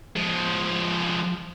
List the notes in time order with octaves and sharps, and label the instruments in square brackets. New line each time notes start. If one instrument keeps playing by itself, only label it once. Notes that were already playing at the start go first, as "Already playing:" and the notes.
[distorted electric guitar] F3 G#3